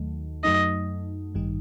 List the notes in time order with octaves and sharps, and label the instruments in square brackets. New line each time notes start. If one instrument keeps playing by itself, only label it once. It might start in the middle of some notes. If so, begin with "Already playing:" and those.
Already playing: [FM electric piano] D#2 D#3 F#3 A3
[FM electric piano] F#2 F#3 A3 D#4 [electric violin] D#5
[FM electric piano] A1 G2 D#3 G3 D#4